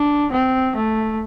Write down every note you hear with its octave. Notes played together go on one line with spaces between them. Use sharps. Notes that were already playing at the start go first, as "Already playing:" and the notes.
Already playing: D4
C4
A3